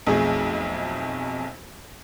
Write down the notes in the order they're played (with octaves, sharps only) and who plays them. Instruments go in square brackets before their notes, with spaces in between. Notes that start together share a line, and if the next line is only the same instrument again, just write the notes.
[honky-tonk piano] B1 F2 A3 G#4